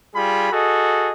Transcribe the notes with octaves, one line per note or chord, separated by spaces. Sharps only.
G3 F4 G#4 B5
F#4 G#4 A4 D#5